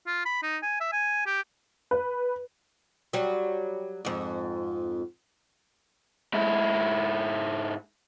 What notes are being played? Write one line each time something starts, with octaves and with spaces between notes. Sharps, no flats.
F4
B5
D#4
G#5
E5
G#5
G4
B4
F#3 G3
F2 G#2
G#2 E4